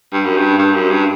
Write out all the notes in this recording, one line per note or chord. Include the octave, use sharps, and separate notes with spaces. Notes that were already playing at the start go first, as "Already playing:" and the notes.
G2
F#2
G2
G2
F#2
G2